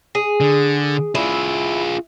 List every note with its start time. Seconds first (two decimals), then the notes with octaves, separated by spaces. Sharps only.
0.15 G#4
0.40 D3
1.15 E4 F4 G#4